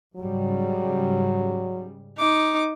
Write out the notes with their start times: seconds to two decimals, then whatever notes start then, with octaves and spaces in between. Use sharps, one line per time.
0.16 G#2 C#3 F#3 G3
2.18 D#4 D6